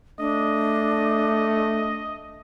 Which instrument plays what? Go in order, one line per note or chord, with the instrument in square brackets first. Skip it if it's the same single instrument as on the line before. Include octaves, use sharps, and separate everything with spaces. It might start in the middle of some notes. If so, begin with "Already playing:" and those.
[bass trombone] A3 [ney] D4 [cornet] D#5